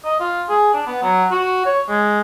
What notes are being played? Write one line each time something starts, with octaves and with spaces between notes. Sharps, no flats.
D#5
F4
G#4
D4
B3
F#3
F#4
C#5
G#3